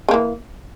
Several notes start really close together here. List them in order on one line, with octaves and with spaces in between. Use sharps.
C#3 A#3 E3